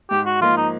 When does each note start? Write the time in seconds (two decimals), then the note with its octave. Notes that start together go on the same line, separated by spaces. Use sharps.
0.10 G#2 G4
0.26 F#4
0.41 F3 A#3 D#4 F4
0.57 D#4